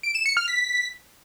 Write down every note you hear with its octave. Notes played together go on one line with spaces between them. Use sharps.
D7
E7
C#7
F6
B6